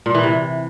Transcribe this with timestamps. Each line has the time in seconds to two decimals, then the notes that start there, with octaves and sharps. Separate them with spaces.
0.06 A#2
0.15 E3
0.23 C3